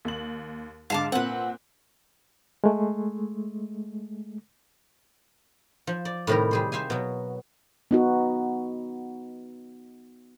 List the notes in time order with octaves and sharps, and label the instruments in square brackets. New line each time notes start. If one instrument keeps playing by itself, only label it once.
[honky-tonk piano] D#2 F#7
[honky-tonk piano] G#2 D3 [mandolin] F5 A5 D6
[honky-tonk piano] A#2 C4 [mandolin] B4 F#5
[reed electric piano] G#3 A3
[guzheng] F3
D5
A2 C3 D#3 G3 A#4
G3 G#4 C5
C5 E5 F5 G#5
B2 F#3
[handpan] B3 D#4 F#4